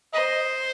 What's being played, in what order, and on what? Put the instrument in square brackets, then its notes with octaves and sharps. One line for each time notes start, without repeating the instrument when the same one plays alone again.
[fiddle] C5 [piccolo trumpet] D#5